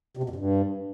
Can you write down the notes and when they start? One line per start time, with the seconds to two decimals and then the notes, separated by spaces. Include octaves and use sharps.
0.17 C3
0.23 B2
0.30 F2
0.36 G2